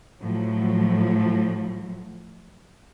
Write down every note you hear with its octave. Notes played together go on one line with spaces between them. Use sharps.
A2 F3 F#3